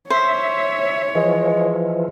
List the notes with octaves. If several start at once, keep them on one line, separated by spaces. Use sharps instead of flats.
C5 C#5 E5
E3 F3 G#3